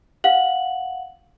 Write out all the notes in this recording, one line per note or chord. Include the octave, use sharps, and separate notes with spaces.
F5 F#5 F#7